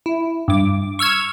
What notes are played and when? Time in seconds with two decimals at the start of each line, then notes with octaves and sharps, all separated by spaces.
0.06 E4
0.48 G2 D6
0.99 C#6 E6 F6 G#6